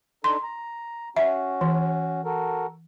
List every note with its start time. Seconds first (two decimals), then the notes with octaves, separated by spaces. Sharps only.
0.24 D4 D#4 A4 C6
0.43 A#5
1.17 C#4 F#4 E5
1.61 E3
2.25 F#4 A4 A#4